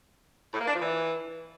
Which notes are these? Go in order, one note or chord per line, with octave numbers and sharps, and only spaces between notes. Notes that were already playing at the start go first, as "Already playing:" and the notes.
A2
A#3
D4
F3
E3